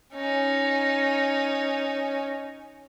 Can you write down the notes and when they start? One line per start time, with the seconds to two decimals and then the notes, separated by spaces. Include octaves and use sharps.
0.13 C#4 D#4